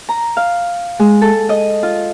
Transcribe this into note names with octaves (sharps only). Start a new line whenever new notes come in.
A#5
F5
G#3
A4
D#5
F4